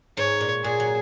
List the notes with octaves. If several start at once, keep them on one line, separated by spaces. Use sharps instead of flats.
G#2 C#5
A#2
A#2 G#4
F#3